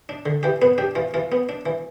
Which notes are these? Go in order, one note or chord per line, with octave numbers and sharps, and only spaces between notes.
D4
D3
E3 G4
B3 B4
D4 G4
E3 F4
E3 F4
B3
D4
E3